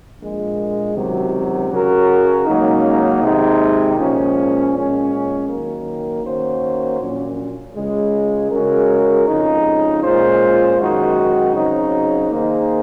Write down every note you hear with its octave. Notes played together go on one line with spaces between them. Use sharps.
A#1 A#2 G#3
C#2 C3 D#3 F#3
C#3 F#3 C#4 F#4 A#4
C#2 C#3 F#3 A#3 D#4
C3 D#3 G#3 D#4
A#2 F3 G#3 C#4
A#2 G#3 C#4
D#3 F#3 A#3
D#3 A#3 C#4 F#4 C5
A#1 A#2 F#3 C#4
C#2 C#3 G#3
C#3 G#3 C#4 F#4 A#4
F2 C#3 G#3 D#4
A#2 G#3 C#4 F4 C5
F#2 D#3 G#3 D#4 F#4
C#3 F#3 C4 D#4
D#3 A#3 D#4 G#4 C5